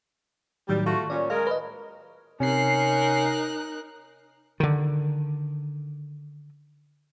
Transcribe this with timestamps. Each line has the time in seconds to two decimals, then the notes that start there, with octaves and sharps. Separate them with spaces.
0.69 A2 D#3 F#3 G3
0.86 A3 F4 F#4
1.10 A#2 C#4 D5
1.30 G#3 A#4 F5
1.47 B4 D#5
2.40 C3 C#4 D#4 A#4 F#6 C7
4.60 D3 D#3